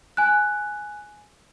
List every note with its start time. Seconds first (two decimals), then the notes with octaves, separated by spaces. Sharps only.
0.17 G#5 F#6